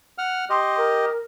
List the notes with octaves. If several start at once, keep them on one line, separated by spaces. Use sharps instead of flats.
F#5 F6
G4 D#5 C6
A#4